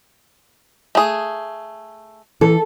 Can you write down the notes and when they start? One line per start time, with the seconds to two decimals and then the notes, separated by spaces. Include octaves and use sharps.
0.95 A3 G#4
2.41 E3 A4